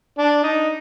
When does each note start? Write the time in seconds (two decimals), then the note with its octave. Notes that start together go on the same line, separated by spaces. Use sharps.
0.18 D4
0.43 D#4